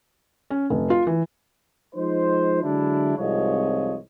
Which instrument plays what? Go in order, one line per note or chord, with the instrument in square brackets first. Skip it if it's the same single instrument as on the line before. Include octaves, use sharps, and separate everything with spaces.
[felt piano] C#4
F1
F4
E3
[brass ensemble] F3 G#3 D#4 C5
D3 F#3 G#3 D4 E4
C2 F2 G#2 F3 C#5 D#5